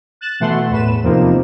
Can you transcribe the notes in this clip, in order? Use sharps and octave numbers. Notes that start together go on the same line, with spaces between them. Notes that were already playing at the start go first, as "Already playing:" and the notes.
F#6 A6 E7
B2 E3 A3 F#5 C6
E2 A2 B4 E7
E2 C3 D#3 F3 A#3 C4